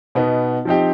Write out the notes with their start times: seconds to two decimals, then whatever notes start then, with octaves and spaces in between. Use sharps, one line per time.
0.15 B2 B3 D#4
0.65 F3 C4 D#4 G4